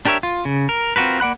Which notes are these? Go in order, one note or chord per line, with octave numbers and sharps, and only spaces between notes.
D4 G4 A#4 C#5 E5
F4
C#3
A#4
C4 F4 F#4 A#4 B4
A#3 D5 F#5 B5 F#6